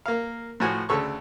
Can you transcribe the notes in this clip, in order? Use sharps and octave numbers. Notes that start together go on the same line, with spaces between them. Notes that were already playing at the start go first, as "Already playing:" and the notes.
A#3 F5
A2 F3 F#4 G#5 F#6
D2 C#3 A4 C#6